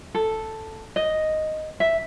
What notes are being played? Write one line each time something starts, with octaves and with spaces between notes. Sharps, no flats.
A4
D#5
E5